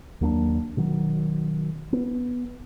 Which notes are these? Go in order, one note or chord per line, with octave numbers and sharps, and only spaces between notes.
D#2 F#3 A#3 D4
B2 D#3 F#3
B3